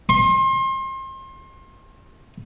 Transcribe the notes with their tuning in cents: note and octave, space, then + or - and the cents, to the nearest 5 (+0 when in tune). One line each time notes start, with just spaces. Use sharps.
C6 +35